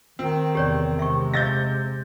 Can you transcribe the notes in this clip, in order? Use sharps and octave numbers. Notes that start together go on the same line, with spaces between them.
D#3 C4
E2 C3 G4 C#5 D5
C3 G#3 E5 C#6
D#5 F5 E6 G6 A6 A#6